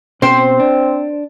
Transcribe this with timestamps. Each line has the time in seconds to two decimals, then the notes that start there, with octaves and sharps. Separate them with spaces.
0.22 B2 C4 C#4 C5 G5
0.60 D4